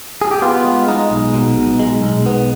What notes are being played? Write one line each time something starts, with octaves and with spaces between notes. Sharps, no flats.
G#4
G4
B3 F4
G#3
G#3 D#4
B1
B2
B1
G#3
B1
B3